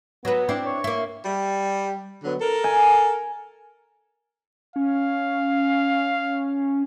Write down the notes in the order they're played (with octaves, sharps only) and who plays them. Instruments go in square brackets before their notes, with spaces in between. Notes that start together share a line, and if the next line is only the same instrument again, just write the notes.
[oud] F#3 B4 [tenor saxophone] B3
[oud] C4 D4 E4
[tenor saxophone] C#5
[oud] A#3 E4
[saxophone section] G3
D3 F#3 B3
A4 A#4
[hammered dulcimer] G#5
[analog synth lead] C#4 [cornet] F5